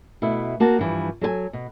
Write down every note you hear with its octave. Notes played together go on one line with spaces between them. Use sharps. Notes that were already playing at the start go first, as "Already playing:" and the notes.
B2 A3 E4
A#3 F#4 A5
G2 E3 F3
F#3 A4 C5 G#5
B2